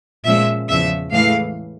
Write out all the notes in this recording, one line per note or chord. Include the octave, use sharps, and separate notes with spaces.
A#2 F3 G#3 C#4 E5
E2 C#3 F3 E5
A2 E3 G#3 F5